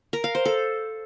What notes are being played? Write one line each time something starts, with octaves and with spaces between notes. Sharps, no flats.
A#4
F5
C5
A4